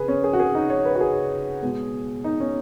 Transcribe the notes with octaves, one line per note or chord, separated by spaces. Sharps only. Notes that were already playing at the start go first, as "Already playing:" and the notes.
Already playing: C#3 G#4 B4
C#4
G#4
F#4
G#4
D#4
C#5
B4
F#4
G#4
B2 G#3
D#4
C#4